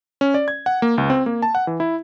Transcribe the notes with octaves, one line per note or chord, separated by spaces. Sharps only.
C#4
D5
G#6
F#5
A#3
C#2
C4
A#3
A5
F#5
E3
E4